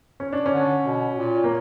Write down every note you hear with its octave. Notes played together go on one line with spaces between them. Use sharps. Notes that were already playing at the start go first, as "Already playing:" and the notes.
C#4
D4
C#4
D3
B2
A#2
A#3